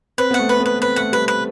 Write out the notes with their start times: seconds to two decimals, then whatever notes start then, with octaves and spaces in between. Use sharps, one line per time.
0.18 C4 B4
0.31 B3 F#5
0.39 A3
0.49 B4
0.60 B3
0.66 B4
0.81 C4 B4
0.96 A3 F#5
1.12 G3 B4
1.28 C4 B4